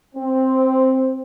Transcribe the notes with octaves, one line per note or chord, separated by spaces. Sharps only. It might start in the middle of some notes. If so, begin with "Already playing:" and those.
C4